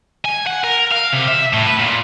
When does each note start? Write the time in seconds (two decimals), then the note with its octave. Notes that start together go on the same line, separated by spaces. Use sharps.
0.25 G#5
0.46 F#5
0.64 A#4
0.92 F5
1.13 C3
1.28 E5
1.53 A2
1.67 B4
1.79 A#2